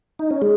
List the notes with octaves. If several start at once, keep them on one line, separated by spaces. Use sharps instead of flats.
D#4
C#4
G#3 G#4